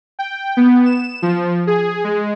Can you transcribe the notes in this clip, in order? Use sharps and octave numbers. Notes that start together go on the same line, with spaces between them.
G5
B3
E7
F3
G#4
G#3